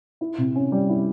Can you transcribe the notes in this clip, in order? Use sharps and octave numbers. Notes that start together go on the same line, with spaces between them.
E4
C3
C#4
G3
E4